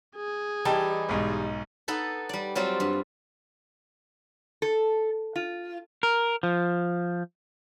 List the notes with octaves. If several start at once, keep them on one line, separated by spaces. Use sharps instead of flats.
G#4
E3 G3 D#4 G5 A5
B1 G#2
B3 D#4 A4 B4
G3 D5
F#3 G3 C4 F4
G2
A4
F4
A#4
F3